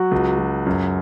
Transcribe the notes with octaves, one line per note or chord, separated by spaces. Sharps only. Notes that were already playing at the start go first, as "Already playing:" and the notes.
Already playing: F#3 F#4
C#2
F#3
F#2